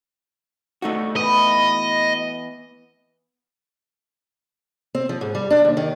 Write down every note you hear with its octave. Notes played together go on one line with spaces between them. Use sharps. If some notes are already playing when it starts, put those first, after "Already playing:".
A3 D#4 F#4
E3 B3 E4 D#5
C4
F3
G#2
G3
D4
D#2
D#3